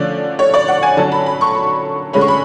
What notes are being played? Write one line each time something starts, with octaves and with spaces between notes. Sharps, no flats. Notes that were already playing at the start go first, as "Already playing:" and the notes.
Already playing: D3 F3 A3 C#4 D5
C#5
D5
F#5
G#5
D3 F#3 C#4 A5
B5
B5
C#6
B5
D3 G#3 C#4 B5
C#6
B5